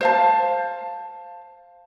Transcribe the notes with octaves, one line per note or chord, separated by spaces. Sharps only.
C5 F5 A5